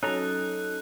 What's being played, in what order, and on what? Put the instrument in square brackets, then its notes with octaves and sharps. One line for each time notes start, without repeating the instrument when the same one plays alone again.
[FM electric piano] F#3 C#4 [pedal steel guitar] D#4 A4 A#5 [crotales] F#6